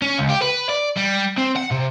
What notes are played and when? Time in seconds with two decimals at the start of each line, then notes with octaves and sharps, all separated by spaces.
0.02 C#4
0.18 C#2
0.30 G4
0.42 B4
0.69 D5
0.97 G3
1.37 C4
1.56 F#5
1.71 C3